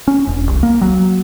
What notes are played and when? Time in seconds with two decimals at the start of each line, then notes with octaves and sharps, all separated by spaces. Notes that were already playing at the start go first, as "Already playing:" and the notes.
0.08 C#4
0.28 E1
0.49 C2
0.63 A#3
0.81 F#3